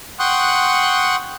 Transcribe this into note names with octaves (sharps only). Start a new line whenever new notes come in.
F#5 G5 C6 C#6 D#6 F#6